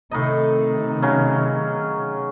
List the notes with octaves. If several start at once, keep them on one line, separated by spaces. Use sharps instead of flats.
A2 C3 D#3 D#4 D#5
C#3 F#3 C#4